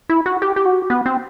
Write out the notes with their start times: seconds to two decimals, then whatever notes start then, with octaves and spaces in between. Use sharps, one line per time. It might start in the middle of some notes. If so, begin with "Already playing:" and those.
0.10 E4
0.26 F#4
0.42 G4
0.56 G4
0.65 F#4
0.90 B3
1.06 C4